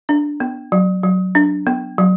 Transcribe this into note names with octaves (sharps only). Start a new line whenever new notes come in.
D4
B3
F#3
F#3
D4
B3
F#3